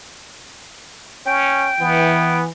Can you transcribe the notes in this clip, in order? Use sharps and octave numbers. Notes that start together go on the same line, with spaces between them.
C#4 G5
E3 B3